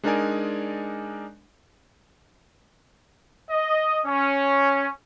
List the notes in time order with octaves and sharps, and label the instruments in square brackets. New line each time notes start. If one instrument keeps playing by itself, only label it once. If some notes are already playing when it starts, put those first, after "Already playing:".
[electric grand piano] G#3 D4 D#4 A#4 D5 G#5
[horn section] D#5
C#4